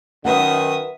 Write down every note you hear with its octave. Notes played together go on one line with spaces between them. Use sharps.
F#2 D#3 A#4 B4 E5 F#5 D#6